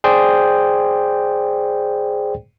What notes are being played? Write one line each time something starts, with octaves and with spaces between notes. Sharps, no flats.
G#4 C5 D5 G5